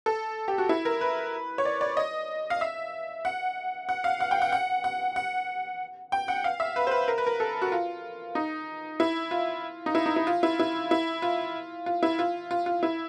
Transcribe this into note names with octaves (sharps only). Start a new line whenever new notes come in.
A4
G4
F#4
E4
A#4
B4
C#5
D5
D5
D#5
F5
E5
F#5
F#5
F5
F#5
G5
F#5
F#5
F#5
F#5
G5
F#5
F5
E5
B4
C5
B4
A#4
B4
A#4
A4
F#4
F4
D#4
E4
F4
D#4
E4
D#4
E4
F4
E4
E4
E4
F4
F4
E4
F4
F4
F4
E4